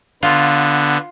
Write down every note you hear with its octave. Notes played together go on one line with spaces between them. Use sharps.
D3 B3 F4